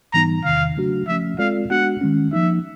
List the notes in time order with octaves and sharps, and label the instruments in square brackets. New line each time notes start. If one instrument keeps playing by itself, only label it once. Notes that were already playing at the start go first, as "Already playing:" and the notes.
[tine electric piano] G#2 E3 G3 B3 D#4 [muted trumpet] A#5
[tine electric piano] E2 C3 D#3 [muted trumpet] F5
[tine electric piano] C#3 F#3 A3 D4 F#4
[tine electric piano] F3 A3 C#4 [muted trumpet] E5
[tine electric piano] G#3 C4 F4 A4 D5 [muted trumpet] F5
[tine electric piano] G#3 B3 D4 F#4 [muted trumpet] F#5
[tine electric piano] D#3 G#3 C#4
[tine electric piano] F3 A#3 D#4 [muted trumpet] E5